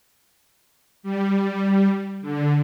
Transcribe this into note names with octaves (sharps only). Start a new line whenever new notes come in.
G3
D3